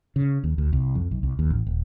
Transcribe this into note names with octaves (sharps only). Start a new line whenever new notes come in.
C#3
D#2
D2
C2
F2
B1
C2
D#2
A1
D#1